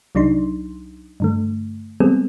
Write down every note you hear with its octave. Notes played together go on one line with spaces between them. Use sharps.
C2 F#3 D4 D#4 C6
G2 D3 A3
G3 G#3 B3 C4 G#4 A4